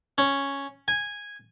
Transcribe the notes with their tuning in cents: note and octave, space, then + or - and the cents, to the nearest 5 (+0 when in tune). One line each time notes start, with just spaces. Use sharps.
C#4 +0
G#5 -10